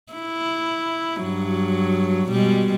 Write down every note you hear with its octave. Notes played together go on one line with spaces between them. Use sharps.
E4
G2 F#3
B2 G3 G#3